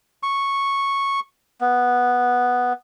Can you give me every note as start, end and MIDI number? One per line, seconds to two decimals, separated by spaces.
0.23 1.20 85
1.61 2.73 59